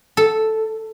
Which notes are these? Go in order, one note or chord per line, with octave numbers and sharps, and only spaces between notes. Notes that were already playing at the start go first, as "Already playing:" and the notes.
A4